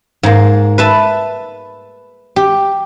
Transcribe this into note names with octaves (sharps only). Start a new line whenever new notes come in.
G#2 A#3
B4 E5 A5
G4